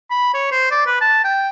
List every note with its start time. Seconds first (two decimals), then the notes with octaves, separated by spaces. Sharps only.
0.11 B5
0.34 C#5
0.52 C5
0.71 D5
0.87 B4
1.01 A5
1.24 G5